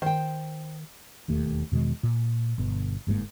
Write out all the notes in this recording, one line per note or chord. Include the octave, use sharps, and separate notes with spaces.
D#3 C5 G5
E1 D#2 A3
E2 B2 D#3 G#3
A#2
G1 B2
G1 G#2 D3 A#3